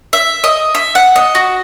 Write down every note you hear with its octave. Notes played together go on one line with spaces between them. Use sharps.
E5
D#5
E5
F#5
D#5
F#4